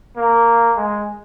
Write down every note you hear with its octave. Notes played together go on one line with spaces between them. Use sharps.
A#3
G#3